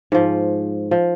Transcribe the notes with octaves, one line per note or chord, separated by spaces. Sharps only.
G#2 F3
F3